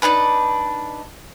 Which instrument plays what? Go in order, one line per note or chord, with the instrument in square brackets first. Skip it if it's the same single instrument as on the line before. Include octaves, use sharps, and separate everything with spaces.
[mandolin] D4 D#4 G#4 B4